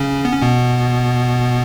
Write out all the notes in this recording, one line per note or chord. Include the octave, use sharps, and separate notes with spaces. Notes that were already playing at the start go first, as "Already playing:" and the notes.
Already playing: C#3 C#4
B3
C#4
B2 B3